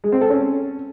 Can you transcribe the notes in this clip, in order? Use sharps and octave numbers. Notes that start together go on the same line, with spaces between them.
G#3
C4
A4
C#4